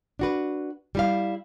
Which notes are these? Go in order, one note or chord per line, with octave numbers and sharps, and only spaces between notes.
D4 F#4 B4
G3 E4 F5